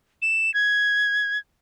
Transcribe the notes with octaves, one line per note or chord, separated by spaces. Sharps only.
E7
G#6